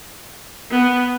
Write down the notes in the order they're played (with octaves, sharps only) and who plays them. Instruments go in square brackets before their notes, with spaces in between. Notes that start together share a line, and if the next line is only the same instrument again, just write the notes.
[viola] B3